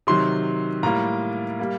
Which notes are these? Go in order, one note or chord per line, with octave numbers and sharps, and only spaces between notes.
C3 D#3 F#3 C6
A2 G3 A#3 A#5
G3 A#3